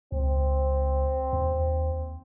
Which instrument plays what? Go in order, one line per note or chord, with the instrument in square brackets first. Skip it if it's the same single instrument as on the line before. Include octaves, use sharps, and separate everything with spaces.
[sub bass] C#2 [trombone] C4
[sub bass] D#2